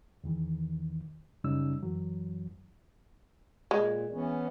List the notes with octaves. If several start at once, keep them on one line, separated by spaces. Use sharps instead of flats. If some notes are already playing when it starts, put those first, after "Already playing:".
E2 D#3 E3
F#2 C#3 G3 C#4 D#4 E6
F#2 E3 F#3
A#2 G#3
E3 B3 C#4